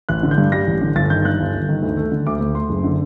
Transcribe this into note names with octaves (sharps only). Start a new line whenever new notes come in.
A1 F#6
D3
G6
G2
G3 A#6
A1
D3
G1 A6
D#3 G6
G2 F#6
G1
G1
D#3
D2
A3
D3
D2 D6
D2
A3 C6
F#1
D3